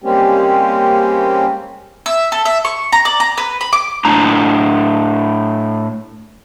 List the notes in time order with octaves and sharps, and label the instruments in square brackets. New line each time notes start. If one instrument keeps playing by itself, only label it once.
[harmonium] G3 G#3 A#3 C4 C#4 G4
[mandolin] E5
A4
E5
C#6
A#5
D5
A#5
B4
B5
D6
[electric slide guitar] A2 D4 A#5